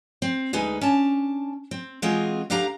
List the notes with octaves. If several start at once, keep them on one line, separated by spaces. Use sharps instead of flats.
C4
D2 G#3 D#4 G#4 B4
C#4 D4 A5
C4
E3 G#3 C4 F4 F#4 G#4
D2 D4 G4 F5 A#5